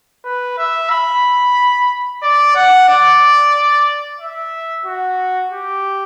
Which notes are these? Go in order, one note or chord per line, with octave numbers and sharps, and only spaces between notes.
B4
E5
B5
D5
F#5
D5
E5
F#4
G4